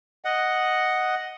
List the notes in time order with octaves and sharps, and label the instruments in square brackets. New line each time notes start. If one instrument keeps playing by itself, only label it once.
[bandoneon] D#5 F#5